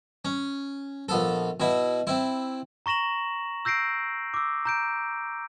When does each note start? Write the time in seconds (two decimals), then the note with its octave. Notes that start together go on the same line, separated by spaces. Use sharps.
0.25 C#4
1.09 A#1 B3 A4
1.60 B2 E4
2.07 C4 E4
2.86 A#5 C#6 A#6 E7 F#7
3.65 E6 G6 A#6 C7 D7
4.34 D6 E6
4.65 A#5 G6 D7